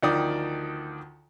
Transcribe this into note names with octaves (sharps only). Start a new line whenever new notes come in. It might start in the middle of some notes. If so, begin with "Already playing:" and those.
D2 D#3 F3 D5 G5 D#6